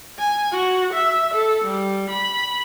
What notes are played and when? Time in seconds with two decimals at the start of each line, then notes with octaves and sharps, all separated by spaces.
0.19 G#5
0.52 F#4
0.93 E5
1.34 A4
1.64 G3
2.10 B5